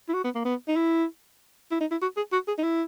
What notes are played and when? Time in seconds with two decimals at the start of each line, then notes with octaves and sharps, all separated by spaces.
0.09 E4
0.14 F#4
0.24 B3
0.35 A#3
0.45 B3
0.68 D#4
0.76 E4
1.71 E4
1.81 D#4
1.91 E4
2.02 F#4
2.17 G#4
2.33 F#4
2.48 G#4
2.58 D#4
2.64 E4